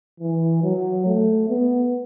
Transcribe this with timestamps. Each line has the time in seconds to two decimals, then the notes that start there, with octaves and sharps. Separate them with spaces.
0.20 E3
0.63 F#3
1.06 A3
1.49 B3